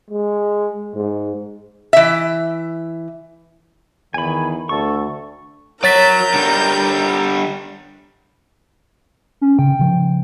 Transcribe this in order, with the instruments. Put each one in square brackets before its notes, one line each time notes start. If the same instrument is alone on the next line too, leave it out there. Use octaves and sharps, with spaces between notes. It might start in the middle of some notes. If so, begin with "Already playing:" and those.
[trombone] G#3
G#2
[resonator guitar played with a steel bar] E3 E5
[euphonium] E2 [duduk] D#3 [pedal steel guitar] G#5 B5
[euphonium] D2 [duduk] A4 [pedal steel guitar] C#6
[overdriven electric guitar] F#3 [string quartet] A#4 G6 [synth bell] C#5 A6 B6
[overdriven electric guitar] D3 G3
[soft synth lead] C#4
[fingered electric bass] C#3 [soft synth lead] G5
[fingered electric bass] C#3 F3